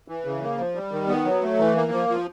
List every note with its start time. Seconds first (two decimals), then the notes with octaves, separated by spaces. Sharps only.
0.08 E3
0.25 C#3
0.41 A#3
0.58 F3
0.75 G3
0.91 D#3
1.08 B3
1.25 F#3
1.42 A3
1.58 E3
1.75 A#3
1.92 F3
2.09 F3